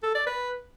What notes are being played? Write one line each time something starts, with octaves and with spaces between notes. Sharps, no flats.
A4
D5
B4